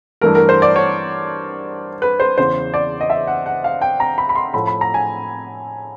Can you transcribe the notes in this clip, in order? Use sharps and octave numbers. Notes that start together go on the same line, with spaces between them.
G2 E3 A3 A#4
A#4
C5
D5
C#5
B4
C5
E2 C#3 E3 C5
D5
D#5
E5
F#5
F#5
F5
G5
A#5
B5
B5
C6
A2 F3 A3 B5
B5
A#5
G#5